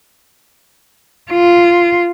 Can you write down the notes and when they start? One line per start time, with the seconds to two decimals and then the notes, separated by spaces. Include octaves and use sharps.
1.31 F4